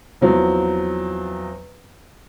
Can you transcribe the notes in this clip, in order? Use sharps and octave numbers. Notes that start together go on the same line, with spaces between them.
E2 F3 F#3 C4